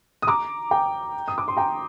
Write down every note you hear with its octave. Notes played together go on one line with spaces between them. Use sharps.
D#6
A#5 D6
G5 A#5
D#6
D6
C6
G5 A#5